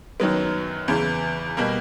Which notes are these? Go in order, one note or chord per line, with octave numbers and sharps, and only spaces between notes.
F#2 D#3 F#3 B3
E2 C#3 E3
B2 G3 A#3